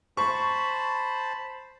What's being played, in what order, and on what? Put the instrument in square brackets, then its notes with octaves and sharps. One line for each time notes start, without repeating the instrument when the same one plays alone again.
[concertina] C5 A5 B5 [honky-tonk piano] C#6